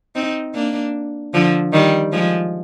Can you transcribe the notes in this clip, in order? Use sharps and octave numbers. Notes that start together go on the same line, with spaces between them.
C4 D#4
A#3 D4
D3 F3
D#3 G3
F3 G#3